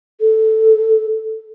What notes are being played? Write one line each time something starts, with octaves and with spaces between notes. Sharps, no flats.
A4